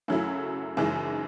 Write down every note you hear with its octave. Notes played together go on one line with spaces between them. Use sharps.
F#2 C#3 F#3 A3 E4
F#1 F#2 E3 G#3 D#4